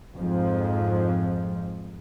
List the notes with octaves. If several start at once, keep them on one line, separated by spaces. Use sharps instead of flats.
F2 G#2 F3